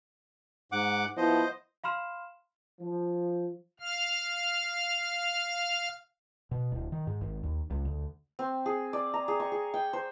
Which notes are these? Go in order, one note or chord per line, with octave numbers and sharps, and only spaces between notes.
G#2 F#5 D6
F3 B3 E4 C5 D#5
F5 B5 C6 F6 E7
F3
F5 F6
B2
D1
D#3
G#2
G#1
D#2
C#2
D2
C4
G#4
D5
A#5
G#4
C#6
G#4
G5
C5